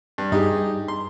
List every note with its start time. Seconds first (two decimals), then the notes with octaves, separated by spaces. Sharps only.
0.18 G2
0.32 G2 D#4 G4 G#4
0.88 C6